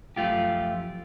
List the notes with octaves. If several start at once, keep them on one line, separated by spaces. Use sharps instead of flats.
F#2 F3 A3 F4 G4